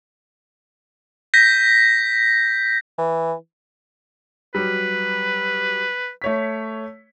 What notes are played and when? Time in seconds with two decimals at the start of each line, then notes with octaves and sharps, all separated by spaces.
1.34 G6 A#6 B6
2.98 E3
4.55 F#3 G3 B4
6.22 A3 C#5 B6